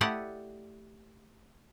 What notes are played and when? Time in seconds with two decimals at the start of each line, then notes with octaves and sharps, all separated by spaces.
0.01 A3 E4 G4 D5 D#5 F#5